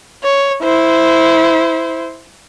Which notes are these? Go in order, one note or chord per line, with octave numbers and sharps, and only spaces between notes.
C#5
E4 C5